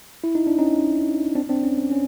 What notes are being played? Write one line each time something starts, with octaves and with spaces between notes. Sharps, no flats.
E4
D#4
D4
C#4 D#4
C4 D4
C4 D4
C#4
C4
C#4